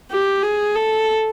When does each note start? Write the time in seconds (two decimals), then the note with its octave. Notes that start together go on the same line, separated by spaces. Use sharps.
0.11 G4
0.43 G#4
0.76 A4